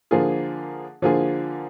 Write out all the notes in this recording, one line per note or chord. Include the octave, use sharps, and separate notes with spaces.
D3 F3 A#3 F4 G#4
D3 F3 A#3 F4 G#4